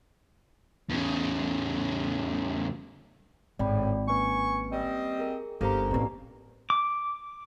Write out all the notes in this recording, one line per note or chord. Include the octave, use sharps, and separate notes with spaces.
E2 C#3
G#1 A2 D5 G5 B5
A#3 C#4 B4 G#5 C#6
G3 C4 D#5
G#4 A#4
G1 A#3 C#4 G4 A4 C5 A#5
A1 G2 B2 A#3 C4 G4 A#5
D6